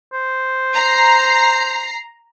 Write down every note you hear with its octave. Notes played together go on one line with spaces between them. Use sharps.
C5
A#5 C7